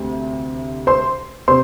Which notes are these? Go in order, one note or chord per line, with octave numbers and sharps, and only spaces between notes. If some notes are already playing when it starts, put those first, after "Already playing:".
Already playing: D2 C3
C5 C6
C3 C5 C6